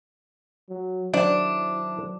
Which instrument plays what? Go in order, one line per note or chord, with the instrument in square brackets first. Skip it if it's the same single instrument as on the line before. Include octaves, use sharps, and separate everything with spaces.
[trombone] F#3
[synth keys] D#3 F#3 C5 [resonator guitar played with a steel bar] D4 [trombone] E4 [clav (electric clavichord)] D5